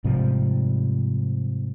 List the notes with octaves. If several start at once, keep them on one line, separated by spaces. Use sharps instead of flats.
G#2 C3 F3 G3